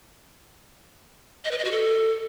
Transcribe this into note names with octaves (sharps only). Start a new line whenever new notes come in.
D#5
B4
D#5
F#4
A4